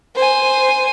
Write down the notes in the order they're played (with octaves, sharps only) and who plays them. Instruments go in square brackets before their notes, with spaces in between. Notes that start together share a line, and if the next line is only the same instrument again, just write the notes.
[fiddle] C5 G#5